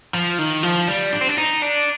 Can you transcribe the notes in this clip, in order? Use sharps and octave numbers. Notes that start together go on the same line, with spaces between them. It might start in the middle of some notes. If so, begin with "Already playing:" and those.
F3
D#3
F3
G3
D4
C4
D4
D#4
D4